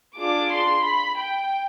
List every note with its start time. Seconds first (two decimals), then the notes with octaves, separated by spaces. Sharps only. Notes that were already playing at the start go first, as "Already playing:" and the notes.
0.16 D4 F4 G#4 D6
0.50 C6
0.84 B5
1.19 G5